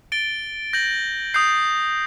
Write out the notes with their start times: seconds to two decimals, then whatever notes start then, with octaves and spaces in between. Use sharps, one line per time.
0.12 A6 D7 G7
0.73 G6 A#6 F#7
1.34 D#6 G6 C7